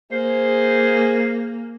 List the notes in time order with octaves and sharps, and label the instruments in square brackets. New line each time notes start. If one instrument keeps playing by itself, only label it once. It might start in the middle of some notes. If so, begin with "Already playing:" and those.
[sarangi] A#3 [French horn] G#4 [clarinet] C5